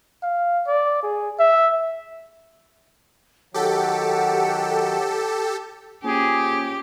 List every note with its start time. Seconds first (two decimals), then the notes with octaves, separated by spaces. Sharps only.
0.23 F5
0.67 D5
1.03 G#4
1.39 E5
3.54 D#3 F#3 G4 A4 F#5
6.04 A#3 C#4 F4 G4 G#4 C5